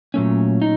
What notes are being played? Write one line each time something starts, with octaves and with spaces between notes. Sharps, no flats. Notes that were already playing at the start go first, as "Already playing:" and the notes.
A#2 F#3 A3 C#4
D#4